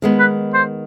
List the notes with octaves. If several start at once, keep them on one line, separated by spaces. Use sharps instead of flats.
D#3 G#3 B3
B4
C5